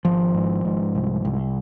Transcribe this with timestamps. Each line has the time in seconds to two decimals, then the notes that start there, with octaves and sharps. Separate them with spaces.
0.05 G#1 F3
0.34 G#2
0.65 G#2
0.95 C2
1.25 C2